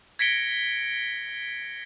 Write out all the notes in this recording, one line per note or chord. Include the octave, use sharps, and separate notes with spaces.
G#6 A#6 B6 C#7 D7 G7